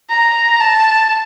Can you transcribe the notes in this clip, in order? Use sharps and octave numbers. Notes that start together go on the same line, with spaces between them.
A#5
A5